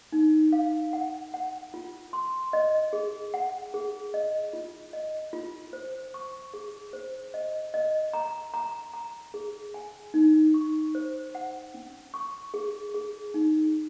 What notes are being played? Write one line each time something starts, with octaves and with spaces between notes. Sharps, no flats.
D#4
F5
F#5
F#5
F4
C6
D#5
G#4
F#5
G#4
D#5
F4
D#5
F4
C5
C#6
G#4
C5
D#5
D#5
A#5
A#5
A#5
G#4
G#5
D#4
C#6
C5
F#5
C#4
C#6
G#4
G#4
D#4